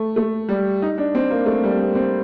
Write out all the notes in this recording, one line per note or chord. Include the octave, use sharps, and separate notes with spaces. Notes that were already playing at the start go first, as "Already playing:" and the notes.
Already playing: A3
A3
G3
D#4
D4
C4
A#3
A3
G3
C4
C4